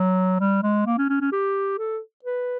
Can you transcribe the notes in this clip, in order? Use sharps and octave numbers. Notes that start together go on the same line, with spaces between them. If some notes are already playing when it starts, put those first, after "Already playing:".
Already playing: F#3
G3
G#3
A#3
C#4
C#4
C#4
G4
A4
B4